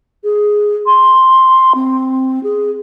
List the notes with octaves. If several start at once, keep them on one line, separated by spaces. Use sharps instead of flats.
G#4
C6
C4
G#4